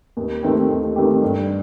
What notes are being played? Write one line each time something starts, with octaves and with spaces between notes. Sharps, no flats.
D#2
D#3 A3 C4 G4
D#2
D#3 A3 C4 G4
G2